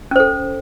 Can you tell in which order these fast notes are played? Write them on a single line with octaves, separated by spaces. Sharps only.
C#4 C5 A4